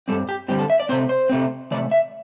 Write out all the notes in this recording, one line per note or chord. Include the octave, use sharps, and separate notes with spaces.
G2 D3 G3 C4 A4
G4
G2 D3 G3 C4 G4
A4
E5
D5
C3 A3 C4 C5
C5
C3 A3 C4
C3 E3 A3 D5
E5